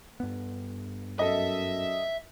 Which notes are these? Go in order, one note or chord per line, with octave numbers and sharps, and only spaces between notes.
G2 B3
F#2 A4 D#5 E5